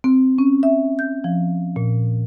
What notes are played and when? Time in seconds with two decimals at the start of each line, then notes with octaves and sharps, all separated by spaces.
0.04 C4
0.38 C#4
0.63 E5
0.99 G6
1.24 F3
1.76 A#2